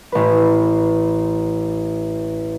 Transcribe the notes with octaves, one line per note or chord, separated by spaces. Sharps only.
A1 B4